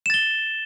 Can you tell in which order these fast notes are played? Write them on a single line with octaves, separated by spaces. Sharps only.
E7 A6 G7